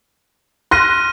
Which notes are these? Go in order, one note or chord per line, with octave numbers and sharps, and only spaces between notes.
C6 F6 F#6 A#6 D#7